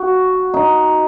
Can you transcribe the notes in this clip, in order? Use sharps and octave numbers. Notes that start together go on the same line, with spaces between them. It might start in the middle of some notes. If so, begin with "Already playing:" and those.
Already playing: F#4
D#4